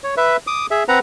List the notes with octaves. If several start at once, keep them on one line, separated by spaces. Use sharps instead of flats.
C#5
B4 E5
D6 D#6
G#4 E5
C4 B4 F#5 A#5